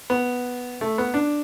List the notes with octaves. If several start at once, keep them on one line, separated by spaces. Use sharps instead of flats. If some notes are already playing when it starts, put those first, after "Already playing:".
B3
A3
B3
D4